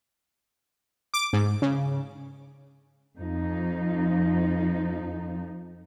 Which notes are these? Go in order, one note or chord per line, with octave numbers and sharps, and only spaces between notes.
D6
G#2
C#3
F2 F3 D#4